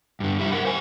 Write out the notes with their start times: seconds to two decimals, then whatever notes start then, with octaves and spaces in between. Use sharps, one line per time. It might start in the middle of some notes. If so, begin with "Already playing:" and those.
0.20 G2 D3
0.39 G3 E4
0.52 A#4 F#5
0.65 C5 G#5